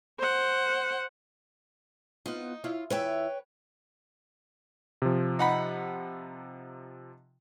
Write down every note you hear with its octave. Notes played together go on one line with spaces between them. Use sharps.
C5 F#5
B3 D#4 F4
E4 F4 C#5
E2 E4 B4 C#5 E5 G5
C3 F3
D#4 F#5 B5